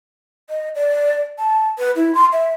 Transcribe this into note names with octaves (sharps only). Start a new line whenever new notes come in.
D#5
D5
A5
B4
E4
C6
E5